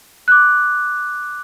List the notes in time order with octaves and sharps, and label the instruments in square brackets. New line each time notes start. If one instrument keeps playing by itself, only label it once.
[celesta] D6 F#6